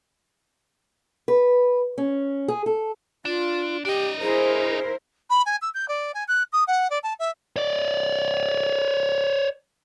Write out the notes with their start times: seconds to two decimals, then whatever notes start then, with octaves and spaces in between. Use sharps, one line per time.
1.28 B4
1.98 C#4
2.48 G#4
2.66 A4
3.25 D4 F4
3.85 D4 G4 D#5
4.21 E4 G#4 A#4 C5
5.30 B5
5.46 G#5
5.62 E6
5.74 G6
5.88 D5
6.14 G#5
6.28 F#6
6.53 D#6
6.67 F#5
6.90 D5
7.03 A5
7.19 E5
7.56 C#5 D5